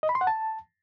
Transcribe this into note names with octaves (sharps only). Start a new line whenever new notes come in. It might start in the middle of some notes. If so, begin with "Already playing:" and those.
D#5
B5
C6
F#5
A5